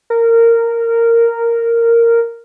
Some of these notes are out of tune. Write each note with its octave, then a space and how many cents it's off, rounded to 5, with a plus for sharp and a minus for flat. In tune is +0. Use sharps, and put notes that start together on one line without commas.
A#4 -10